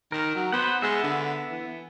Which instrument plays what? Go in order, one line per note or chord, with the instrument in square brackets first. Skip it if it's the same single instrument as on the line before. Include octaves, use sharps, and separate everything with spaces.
[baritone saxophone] D#3 [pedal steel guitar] A#4
[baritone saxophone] F#3
[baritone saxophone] B3 [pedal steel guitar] C5 F#5
[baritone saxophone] G#3 [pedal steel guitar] B3 E5
[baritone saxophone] D3
E3